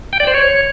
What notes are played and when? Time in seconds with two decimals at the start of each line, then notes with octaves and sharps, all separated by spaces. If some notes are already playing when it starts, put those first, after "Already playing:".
0.13 G5
0.20 D5
0.27 C5
0.34 C#5